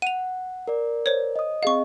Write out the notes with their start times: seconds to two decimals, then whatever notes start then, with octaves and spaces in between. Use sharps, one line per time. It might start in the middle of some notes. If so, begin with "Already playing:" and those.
0.02 F#5 D#7 F7
0.68 A#4 D5
1.06 C5 C#5
1.36 D#5 D#6
1.63 C4 G#4 D#5 F5 C#6